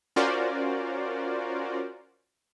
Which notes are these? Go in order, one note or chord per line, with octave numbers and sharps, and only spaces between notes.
C#4 F4 F#4 A#4 C5 D5